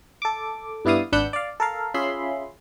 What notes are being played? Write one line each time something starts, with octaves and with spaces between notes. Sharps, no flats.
A4 D6
G2 B3 E4 D5 F5 D#6
G#1 D4 B4 F#5 E6 G6
D5 F5
A4 A#4 F5
C#4 F4 G#4 E5 B5 C6